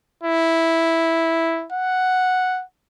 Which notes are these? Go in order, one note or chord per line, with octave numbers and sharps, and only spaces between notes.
E4
F#5